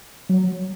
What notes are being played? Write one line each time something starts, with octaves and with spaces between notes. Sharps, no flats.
F#3